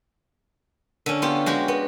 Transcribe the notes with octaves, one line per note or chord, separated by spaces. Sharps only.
D3 C#4
B3 F4 G4
G#3 F#4 G4
B3